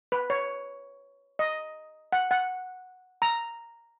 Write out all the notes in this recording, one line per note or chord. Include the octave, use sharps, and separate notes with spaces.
B4
C#5
D#5
F#5
F#5
A#5